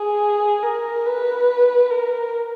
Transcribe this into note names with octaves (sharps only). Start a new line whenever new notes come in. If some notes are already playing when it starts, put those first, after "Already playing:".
Already playing: G#4
A#4
B4
A#4